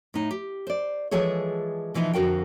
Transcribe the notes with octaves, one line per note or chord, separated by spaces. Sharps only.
A2 D#4
G4
C5 D5
E3 F3 G#3 G#4 A4 C#5
B2 E3 F3 D#4 E4
F2 D3 F#4 A#4 F5 G5